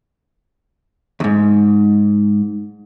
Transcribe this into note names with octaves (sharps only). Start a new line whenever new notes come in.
D#2 G#2